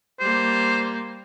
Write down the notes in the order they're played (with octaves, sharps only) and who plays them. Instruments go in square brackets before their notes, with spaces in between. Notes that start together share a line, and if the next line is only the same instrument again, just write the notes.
[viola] G3 A#3 [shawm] C5